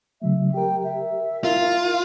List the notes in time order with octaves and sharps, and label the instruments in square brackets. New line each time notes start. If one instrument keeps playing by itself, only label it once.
[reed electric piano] C#3 F#3 A3 [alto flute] E5
[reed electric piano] G4 A#4 [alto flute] G5
[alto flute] E5
[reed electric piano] E4 A#4 [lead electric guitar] F4